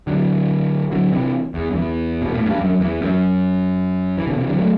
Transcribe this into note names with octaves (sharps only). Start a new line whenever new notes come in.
D3 F#3
D3 F#3
C3 E3
E2
F#2
E2
B2
A2
G2
F#2
F#2
E2
F#2
E3
B2 D3
C3 E3
D3 F#3
F#3 A3